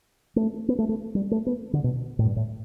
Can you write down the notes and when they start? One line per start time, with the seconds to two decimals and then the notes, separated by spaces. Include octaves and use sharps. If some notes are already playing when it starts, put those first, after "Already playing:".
0.36 A3
0.68 B3
0.79 A3
0.89 A3
1.15 G3
1.31 A3
1.46 B3
1.73 D3
1.84 B2
2.19 A2
2.25 G2
2.36 A2